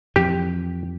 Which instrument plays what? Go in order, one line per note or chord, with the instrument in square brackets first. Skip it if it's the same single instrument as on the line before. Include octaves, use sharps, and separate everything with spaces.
[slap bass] F2 E3 [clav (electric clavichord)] G4